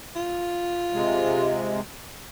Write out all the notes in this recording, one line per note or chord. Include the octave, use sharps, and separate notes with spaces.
F4
C3 G#3